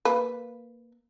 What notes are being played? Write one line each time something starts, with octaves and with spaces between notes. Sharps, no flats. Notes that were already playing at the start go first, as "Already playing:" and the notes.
A#3 B4